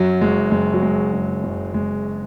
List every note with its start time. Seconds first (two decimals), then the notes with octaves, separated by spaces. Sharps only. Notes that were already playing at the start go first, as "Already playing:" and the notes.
Already playing: F#2 F#3
0.21 F#1 G#3
0.51 F#1 G#3
0.74 F#3
0.82 F#2 G#3
1.13 F#1
1.43 F#1
1.74 F#1 G#3